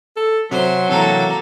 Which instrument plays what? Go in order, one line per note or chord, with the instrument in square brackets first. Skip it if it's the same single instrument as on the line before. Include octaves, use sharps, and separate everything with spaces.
[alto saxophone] A4
[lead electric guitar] C3 [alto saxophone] F#3 [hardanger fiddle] C5
[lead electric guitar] C3 E3 [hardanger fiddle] A#3 A4